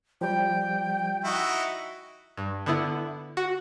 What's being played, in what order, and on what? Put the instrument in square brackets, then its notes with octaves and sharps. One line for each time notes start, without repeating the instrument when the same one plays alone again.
[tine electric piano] F3 G3 [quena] G5
[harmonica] D#4 E4 F#4
[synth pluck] G2
D3 B3 E4
F#4